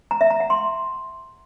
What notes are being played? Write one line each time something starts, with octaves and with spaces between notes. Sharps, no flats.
A#5
E5
A#5
F#5
C6